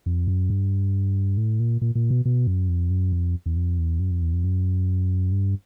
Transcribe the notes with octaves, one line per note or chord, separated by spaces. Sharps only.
F2
F#2
G2
A2
A#2
A#2
A#2
B2
B2
F#2
F2
F#2
F2
E2
F2
E2
F#2
F2
E2
F2
F#2
G2